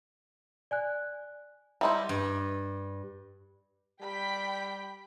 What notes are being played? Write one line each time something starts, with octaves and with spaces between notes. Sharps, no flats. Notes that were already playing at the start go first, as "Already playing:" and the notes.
D5 G#5 F#6
G3 D#4 E4 E5 C6
G2
G3 G5 B5 B6